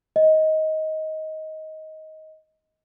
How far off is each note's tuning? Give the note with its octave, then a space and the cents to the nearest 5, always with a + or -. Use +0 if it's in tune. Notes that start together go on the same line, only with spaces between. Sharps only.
D#5 +15